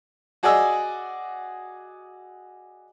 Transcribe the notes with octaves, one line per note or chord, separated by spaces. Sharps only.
F#4 G#4 D5 D#5 G#5 E6